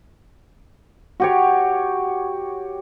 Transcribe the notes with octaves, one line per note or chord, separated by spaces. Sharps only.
F#4 G4 C#5